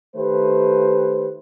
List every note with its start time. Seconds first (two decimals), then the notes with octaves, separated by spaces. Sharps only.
0.15 D#3 A3 G4 B4 C5